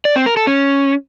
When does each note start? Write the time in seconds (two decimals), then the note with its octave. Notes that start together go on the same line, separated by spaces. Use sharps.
0.05 D5
0.16 C4
0.26 A#4
0.37 A4
0.47 C#4